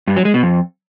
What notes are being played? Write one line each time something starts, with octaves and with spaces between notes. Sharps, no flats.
G2
F#3
G#3
B2
F2